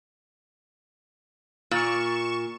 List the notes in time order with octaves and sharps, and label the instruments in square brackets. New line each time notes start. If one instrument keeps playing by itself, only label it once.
[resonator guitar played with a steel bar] A#2 [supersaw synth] C#6 E7